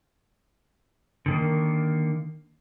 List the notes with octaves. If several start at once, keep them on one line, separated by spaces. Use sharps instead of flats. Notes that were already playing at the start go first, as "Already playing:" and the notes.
D3 D#3 A#3